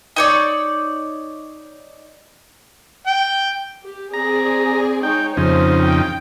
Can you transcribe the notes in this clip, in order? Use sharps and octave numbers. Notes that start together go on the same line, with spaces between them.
D#4 C#5 D5
G5
G4
C4 G#4 D5 A#5
G#3 D#4 C#5 G5
F2 C#3 D#4 C5
G5